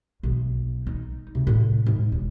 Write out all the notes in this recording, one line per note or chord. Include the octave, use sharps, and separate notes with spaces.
B1
D#4
C3
A2
G#2
E1